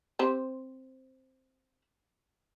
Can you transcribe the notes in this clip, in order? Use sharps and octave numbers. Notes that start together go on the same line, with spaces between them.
C4 G4 C5